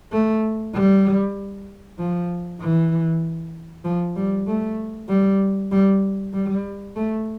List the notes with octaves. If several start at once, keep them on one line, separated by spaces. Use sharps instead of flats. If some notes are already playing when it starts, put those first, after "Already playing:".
A3
G3
F3
E3
F3
G3
A3
G3
G3
G3
A3